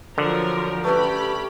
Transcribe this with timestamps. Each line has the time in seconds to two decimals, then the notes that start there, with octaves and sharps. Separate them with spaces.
0.18 D3 F3 F#3 A#4
0.84 A3 C#4 G4 B4 B5